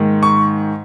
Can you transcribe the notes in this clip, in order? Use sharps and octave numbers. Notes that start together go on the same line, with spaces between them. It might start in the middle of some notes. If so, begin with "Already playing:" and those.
Already playing: G#2 D#3 A#3
C#6